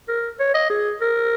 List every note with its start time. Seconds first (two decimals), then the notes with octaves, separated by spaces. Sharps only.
0.08 A#4
0.40 C#5
0.54 D#5
0.70 G#4
1.01 A#4